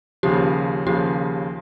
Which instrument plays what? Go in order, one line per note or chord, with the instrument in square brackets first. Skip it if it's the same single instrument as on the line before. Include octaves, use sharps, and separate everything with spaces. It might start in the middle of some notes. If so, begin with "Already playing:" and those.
[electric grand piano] D#2 C#3 F3 [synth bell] G4
[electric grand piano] D#2 C#3 F3 [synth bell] G4